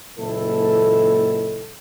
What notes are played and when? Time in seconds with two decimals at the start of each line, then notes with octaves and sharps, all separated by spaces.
0.18 F#1 A#2 G#3 E4 A4